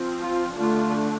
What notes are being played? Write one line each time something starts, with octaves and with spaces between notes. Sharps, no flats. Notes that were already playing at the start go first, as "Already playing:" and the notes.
Already playing: F3 C4
F4
D3 A3 D4 F4